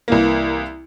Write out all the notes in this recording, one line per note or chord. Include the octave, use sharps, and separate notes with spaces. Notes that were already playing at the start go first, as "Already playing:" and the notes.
C2 E3 A#3